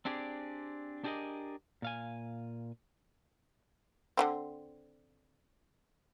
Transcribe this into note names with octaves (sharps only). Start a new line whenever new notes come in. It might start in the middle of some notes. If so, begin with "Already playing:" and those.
C4 D4 G4 G#4 D5
D4 G4 G#4 A#4 D#5
A#2 F5 G#5
D3 E3 C4